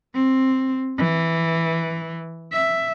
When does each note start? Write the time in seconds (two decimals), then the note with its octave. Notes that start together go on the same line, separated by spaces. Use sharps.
0.15 C4
0.98 E3
2.53 E5